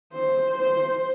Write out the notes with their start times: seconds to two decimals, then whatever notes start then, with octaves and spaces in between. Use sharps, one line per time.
0.13 C5
0.58 C5